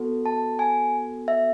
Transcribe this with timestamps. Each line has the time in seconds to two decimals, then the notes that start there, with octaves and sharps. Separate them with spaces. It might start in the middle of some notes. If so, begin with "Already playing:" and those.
Already playing: B3 F#4 A4
0.26 A5
0.59 G#5
1.28 E5